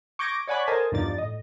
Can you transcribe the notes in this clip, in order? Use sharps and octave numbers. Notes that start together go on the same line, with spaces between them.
C#6 D6 G6 G#6 A#6 D7
C#5 D5 F#5 G#5 B5 C#6
A4 A#4 C5 D#5 G#5 A5
E2 G2 F3 D#4 D5 A6
A2 D#5